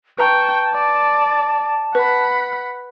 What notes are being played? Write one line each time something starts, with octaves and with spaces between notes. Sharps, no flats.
B4 G5 A5 A#5 C#6
D5
B4 F#5 B5